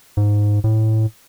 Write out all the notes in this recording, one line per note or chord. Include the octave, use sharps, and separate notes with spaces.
G#2
A2